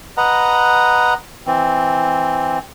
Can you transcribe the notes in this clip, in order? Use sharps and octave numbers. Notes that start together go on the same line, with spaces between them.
B4 D#5 F#5 A#5
E3 C4